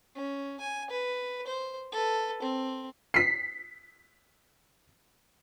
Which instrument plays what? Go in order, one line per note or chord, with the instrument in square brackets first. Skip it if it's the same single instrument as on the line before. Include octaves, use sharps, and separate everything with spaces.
[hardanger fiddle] C#4
G#5
B4
C5
A4 B4
C4
[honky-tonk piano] B6 C7